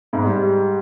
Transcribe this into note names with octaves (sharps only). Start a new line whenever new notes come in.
G#2 G#3
G3